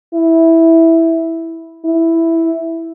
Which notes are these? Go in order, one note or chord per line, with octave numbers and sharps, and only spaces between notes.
E4
E4